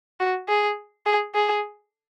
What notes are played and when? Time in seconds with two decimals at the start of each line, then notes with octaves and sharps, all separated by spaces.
0.20 F#4
0.48 G#4
1.06 G#4
1.35 G#4